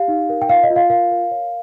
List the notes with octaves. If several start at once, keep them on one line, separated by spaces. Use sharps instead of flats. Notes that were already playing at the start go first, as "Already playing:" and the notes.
Already playing: G4 F5
D#4
A#4
G5
F4 F5
D#5
F4
F5
A#4 F5
A#4
C#5